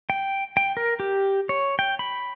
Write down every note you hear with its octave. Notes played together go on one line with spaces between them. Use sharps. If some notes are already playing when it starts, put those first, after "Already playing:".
G5
G5
A#4
G4
C#5
G5
B5